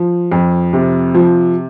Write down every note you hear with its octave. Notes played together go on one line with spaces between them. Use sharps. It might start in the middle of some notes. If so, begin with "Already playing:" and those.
Already playing: F3
F2
C3
F3